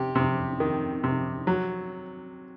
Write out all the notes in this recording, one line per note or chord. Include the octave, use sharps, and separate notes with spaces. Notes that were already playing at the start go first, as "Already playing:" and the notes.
Already playing: C3 G4
C3
D#3
C3
F#3